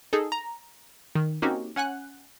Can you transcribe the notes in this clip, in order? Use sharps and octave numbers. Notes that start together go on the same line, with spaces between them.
D#4 G#4 A4
A#5
D#3
A#3 C4 C#4 D#4 F#4 G4
C#4 F#5 G#5 F#6